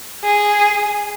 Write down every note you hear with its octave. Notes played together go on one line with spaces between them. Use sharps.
G#4